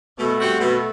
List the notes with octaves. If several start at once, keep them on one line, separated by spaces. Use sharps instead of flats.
B2 A3
G3 C4 F#4
B2 A3